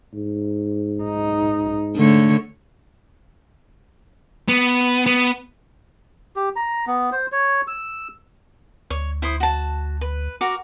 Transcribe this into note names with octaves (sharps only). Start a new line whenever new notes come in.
G#2
D#4
D3 A3 C#5
B3
B3
G4
A#5
B3
C5
C#5
E6
D2 C#5
E4 C5 D#6
F#4 A5
B4
F#4 A#4 D6